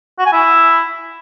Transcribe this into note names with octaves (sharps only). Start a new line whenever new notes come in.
F#4
G#5
E4